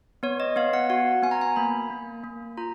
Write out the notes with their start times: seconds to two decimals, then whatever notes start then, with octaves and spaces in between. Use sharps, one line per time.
0.23 B3 C#5
0.40 D#5
0.56 B3 F5
0.73 F#5
0.90 F#4 F#5
1.23 B3 G#5
1.31 A#5
1.41 G#5
1.56 A#3 B5
1.90 A#3
2.24 A#3
2.57 F4 A#5